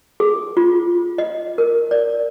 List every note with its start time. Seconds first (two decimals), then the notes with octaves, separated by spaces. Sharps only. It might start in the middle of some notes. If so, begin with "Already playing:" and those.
0.20 G#4
0.57 F4
1.18 D#5
1.58 A#4
1.91 D5